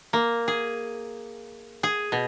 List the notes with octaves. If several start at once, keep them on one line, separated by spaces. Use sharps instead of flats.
A#3
G#4
G#4
B2